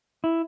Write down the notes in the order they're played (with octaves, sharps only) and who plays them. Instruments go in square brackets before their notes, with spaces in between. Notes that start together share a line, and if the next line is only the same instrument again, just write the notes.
[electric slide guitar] E4